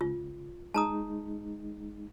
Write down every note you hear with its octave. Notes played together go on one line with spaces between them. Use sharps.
C#2 F4
G#3 D#4 A5 A#5 D#6